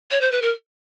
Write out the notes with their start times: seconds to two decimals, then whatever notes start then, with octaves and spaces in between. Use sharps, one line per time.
0.11 C#5
0.21 C5
0.32 B4
0.42 A#4